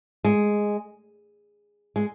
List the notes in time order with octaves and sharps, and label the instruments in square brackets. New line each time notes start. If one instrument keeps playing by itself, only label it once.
[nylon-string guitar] G#3
G#3